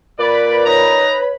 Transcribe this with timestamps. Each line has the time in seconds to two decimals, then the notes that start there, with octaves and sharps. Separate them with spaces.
0.19 A#2 B4 D5 B5
0.66 D#4 C#5 A#5